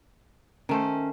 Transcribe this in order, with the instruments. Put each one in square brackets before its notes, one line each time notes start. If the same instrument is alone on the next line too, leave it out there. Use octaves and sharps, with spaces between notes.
[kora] D#3 A3 C5 [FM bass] C#4